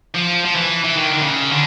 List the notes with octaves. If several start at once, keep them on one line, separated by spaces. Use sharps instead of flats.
F3
F3
E3
E3
D#3
D3
C#3
D3